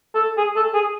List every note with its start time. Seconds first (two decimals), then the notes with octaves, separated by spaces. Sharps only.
0.15 A4
0.38 G#4
0.56 A4
0.74 G#4